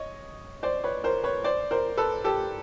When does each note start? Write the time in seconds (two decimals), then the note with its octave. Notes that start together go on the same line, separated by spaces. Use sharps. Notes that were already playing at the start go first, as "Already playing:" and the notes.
Already playing: C#5 D#5
0.63 C5 D5
0.84 B4 C#5
1.04 A#4 C5
1.24 B4 C#5
1.44 C5 D5
1.71 A#4 C5
1.97 A4 B4
2.24 G4 A4